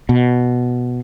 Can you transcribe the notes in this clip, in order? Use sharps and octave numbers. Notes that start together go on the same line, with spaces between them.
B2